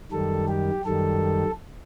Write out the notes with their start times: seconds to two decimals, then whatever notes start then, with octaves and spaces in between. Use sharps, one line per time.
0.12 F#2 D#3 G3 A4
0.48 G4
0.85 F#2 D#3 G3 A4